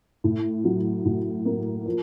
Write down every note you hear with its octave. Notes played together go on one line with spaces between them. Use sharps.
A2
F#3
A2
A#3
F3